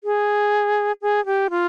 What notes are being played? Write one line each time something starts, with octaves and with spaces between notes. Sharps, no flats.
G#4
G#4
G4
F4